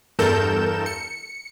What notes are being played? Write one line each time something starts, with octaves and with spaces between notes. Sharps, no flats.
E2 G2 A4 A#4 G6 E7
C#7